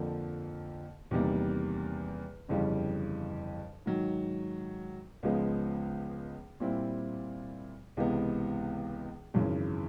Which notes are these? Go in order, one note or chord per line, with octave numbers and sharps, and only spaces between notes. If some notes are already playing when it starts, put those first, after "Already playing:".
Already playing: F2 D3 F3 A#3
E2 C3 D#3 G3 A#3
G1 F2 C#3 E3 G3
G#2 D#3 F#3
C#2 C#3 F3 G#3 B3
A#2 G3 C4 E4
C#2 C3 E3 G#3 B3
G#1 F#2 C#3 E3